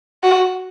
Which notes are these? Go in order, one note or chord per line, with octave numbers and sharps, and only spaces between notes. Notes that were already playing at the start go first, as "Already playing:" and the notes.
F#4